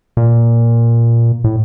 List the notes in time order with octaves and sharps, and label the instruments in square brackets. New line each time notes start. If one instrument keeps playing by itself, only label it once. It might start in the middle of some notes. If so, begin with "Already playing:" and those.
[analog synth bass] A#2
A2